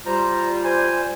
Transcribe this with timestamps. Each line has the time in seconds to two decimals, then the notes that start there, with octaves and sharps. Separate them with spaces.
0.06 G3 F4 C5 A#5
0.64 C5 G#5